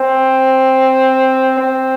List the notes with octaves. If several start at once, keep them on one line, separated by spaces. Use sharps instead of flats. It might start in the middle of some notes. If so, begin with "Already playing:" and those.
Already playing: C4
C4